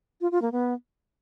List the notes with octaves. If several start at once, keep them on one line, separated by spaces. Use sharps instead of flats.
F4
F4
A#3
B3